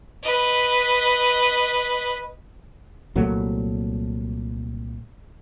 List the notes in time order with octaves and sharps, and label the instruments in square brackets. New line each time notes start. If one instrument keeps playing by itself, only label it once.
[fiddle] B4 D#5
[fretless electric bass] C2 A#2 F#3 A3